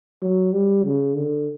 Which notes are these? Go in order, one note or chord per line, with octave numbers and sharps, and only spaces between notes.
F#3
G3
C#3
D3